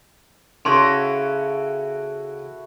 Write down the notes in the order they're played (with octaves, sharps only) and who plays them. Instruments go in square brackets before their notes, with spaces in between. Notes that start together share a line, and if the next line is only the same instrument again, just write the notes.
[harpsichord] C#3 [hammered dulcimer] E4 F#4 A4 [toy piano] C6 C#6